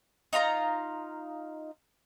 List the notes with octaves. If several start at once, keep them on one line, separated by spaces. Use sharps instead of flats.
D#4 F4 F5 A#5